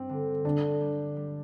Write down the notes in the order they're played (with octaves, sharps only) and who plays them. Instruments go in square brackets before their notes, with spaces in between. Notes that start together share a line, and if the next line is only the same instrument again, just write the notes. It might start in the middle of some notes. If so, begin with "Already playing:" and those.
Already playing: [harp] G2 G3 [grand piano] C4
[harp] D3
[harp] D3 [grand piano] D4
[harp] G3
G3